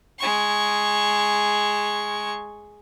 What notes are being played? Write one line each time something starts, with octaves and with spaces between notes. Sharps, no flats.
G#3 C#6